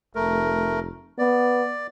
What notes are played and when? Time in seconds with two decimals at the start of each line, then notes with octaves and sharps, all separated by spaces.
0.15 F1 A3 A#4
1.18 B3 D5